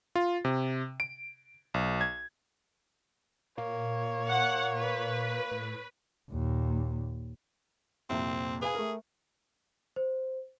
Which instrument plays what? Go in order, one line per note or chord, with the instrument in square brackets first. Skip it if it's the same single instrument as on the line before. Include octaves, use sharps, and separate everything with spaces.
[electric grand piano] F4
C3
D7
B1
G#6
[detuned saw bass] A#2 [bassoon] A#3 [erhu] C#5
[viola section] F#5
B4
[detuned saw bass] A2
[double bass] D#2 A#2
[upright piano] C2 F2 A#2 [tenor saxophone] C4
[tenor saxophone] G#4 [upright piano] B4 F5 G#5
[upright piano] A3 A#4
[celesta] C5